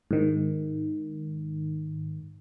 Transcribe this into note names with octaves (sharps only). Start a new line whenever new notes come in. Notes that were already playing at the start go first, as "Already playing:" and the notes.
G#2 D#3